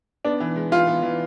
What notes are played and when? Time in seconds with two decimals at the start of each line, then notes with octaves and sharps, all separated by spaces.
0.25 B3 D4
0.40 E3
0.56 G#3
0.72 E3 F4
0.87 B3
1.02 E3